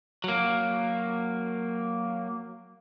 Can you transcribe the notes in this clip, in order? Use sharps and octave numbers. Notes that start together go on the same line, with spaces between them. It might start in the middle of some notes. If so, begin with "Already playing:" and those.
F#3 A#3